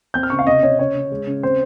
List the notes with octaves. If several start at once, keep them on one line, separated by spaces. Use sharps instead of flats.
C4 G6
F6
C#3 C#6
F5
C3 D#5
C3 C#5
C#3 C#5
C#3
G#3
C#3
C4 C5